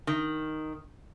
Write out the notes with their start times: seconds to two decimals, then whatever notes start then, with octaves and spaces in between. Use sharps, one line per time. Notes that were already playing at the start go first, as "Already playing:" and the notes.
0.07 D#3